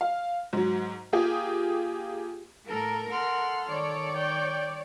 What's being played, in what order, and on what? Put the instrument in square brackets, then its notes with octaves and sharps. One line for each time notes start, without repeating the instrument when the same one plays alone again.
[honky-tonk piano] F5
G#2 F#3
A#3 F4 G4 G#4
[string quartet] A2 [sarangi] A4 [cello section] A#4
[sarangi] A4 [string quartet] F#5 C6 F6
[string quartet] D#3 [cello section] C#5 D5
[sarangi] G5